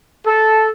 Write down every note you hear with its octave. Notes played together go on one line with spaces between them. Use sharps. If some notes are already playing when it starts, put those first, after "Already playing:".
A4